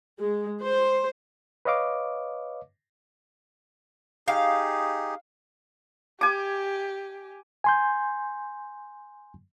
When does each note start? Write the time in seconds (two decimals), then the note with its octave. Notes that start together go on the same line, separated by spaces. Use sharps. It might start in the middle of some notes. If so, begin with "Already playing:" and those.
0.20 G#3
0.62 C5
1.65 B4 C#5 D#5 F5 D6
4.28 D#4 G4 G#4 F5
6.21 G4 G#5 D6
7.64 G#5 C6 G6